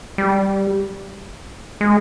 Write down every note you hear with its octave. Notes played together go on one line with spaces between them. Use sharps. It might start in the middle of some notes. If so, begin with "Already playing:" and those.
G3
G#3